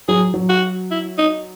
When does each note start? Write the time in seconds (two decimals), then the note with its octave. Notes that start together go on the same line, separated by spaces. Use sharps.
0.08 F#3 G#4
0.34 F#3
0.49 F#4
0.91 E4
1.18 D#4